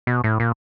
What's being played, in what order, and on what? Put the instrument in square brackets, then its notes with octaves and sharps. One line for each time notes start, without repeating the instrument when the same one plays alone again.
[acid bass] B2
A2
A#2